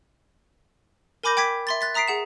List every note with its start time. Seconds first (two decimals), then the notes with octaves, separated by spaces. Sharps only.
1.23 A#4 G#5 B5 D6 G6 A#6
1.37 G5 D6 G#6 B6
1.67 E5 C6 A6
1.81 F#6 A6 B6
1.95 E5 A#5 D#6 B6 C7 D7
2.08 G#4 F#5 E7